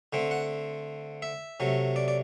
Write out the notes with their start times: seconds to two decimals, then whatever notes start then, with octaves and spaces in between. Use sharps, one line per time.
0.13 D3 A3 C4
0.31 F#5
1.22 E5
1.60 C3 F#3 A3
1.96 D5
2.08 D5